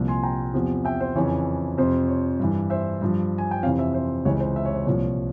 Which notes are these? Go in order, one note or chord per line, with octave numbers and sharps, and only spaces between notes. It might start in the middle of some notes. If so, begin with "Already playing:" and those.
Already playing: C2 A#2 F3
G#5 C6
G5 A#5
E2 C3 F3
E5 G5
C5
F2 C#3 E3 C#5
F2 C3 F3 C5
C#5
G2 E3
C5 E5
G2 F3
G#5
G5
F2 C3 E3 C#5 F5
C5 E5
C5 E5
C#2 C3 E3 C#5
C5
E5
C#5
C5
C2 A#2 F3 C#5